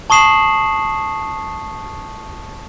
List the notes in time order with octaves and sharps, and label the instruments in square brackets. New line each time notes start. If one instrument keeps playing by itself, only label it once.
[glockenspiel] A5 C#6 D#6 C7 E7 F#7